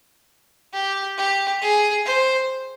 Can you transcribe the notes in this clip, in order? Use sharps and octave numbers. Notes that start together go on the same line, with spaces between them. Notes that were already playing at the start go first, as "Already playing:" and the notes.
G4
G4
G#4
C5